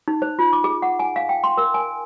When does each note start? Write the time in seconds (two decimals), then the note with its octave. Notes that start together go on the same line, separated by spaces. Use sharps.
0.08 D#4
0.22 C5
0.39 F4
0.53 D6
0.64 G#4
0.82 F#5
0.99 G#5
1.16 F5
1.29 G5
1.44 C6
1.57 A#4
1.74 G#5